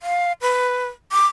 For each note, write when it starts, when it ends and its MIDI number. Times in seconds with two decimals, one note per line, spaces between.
0.02 0.32 77
0.41 0.86 71
1.12 1.26 86